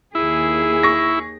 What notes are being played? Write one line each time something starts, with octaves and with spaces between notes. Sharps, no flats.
D#2 E4 G#4
C#6 A#6